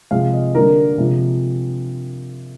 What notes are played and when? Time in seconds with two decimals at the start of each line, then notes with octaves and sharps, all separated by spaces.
0.11 C3 F3 G#3 F5
0.33 D#5
0.55 D3 G3 A#3 A#4
0.98 C3 F3 G#3